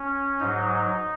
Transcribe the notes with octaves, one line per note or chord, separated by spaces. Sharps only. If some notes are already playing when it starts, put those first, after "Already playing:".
Already playing: C#4
G#2 F#3 D#4